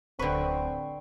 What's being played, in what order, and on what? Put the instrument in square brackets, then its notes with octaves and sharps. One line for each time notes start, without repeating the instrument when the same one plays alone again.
[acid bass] D1 [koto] D3 B4 [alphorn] C4 [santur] G5 C6 C#6